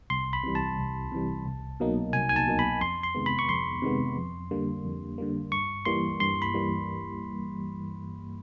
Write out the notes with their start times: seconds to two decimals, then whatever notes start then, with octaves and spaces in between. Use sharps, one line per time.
0.10 C2 C6
0.33 B5
0.44 C3 E3 G3
0.55 A5
0.78 C2
1.12 C3 E3 G3
1.46 C2
1.80 B2 F#3 A#3 D#4
2.13 C2 G#5
2.29 G#5
2.36 A5
2.47 B2 F#3 A#3 D#4
2.59 B5
2.81 F2 C6
3.03 C6
3.15 C3 D#3 G#3 B3
3.26 B5
3.39 C#6
3.49 F2 C6
3.82 C3 D#3 G#3 B3
4.17 F2
4.51 D3 G3 A#3
4.85 F2
5.18 D3 G3 A#3
5.52 G2 C#6
5.86 E3 G3 A#3 C6
6.20 G2 C6
6.42 B5
6.54 E3 G3 A#3